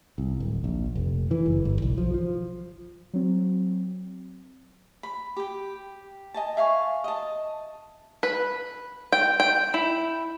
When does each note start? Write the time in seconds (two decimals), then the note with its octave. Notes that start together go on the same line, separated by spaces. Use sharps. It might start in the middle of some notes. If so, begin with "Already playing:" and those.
0.18 C2
0.40 D1
0.64 A#1
0.95 F1
1.31 E3
1.46 F#1
1.65 G1
1.82 B1
1.98 F3
2.14 F3
3.14 F#3 C4
5.03 B5
5.37 G4 G5
6.34 D#5 G#5 A5
6.57 E5 F5 G#5 C#6
7.04 D#5 A5
8.23 B4
9.12 G5
9.40 G5
9.74 E4